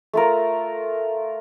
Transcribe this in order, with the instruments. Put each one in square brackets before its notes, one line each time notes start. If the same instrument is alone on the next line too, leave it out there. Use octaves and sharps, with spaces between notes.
[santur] A3 F4 A#4